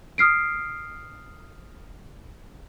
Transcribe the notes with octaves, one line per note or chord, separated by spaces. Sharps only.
D#6 F6 C7 D7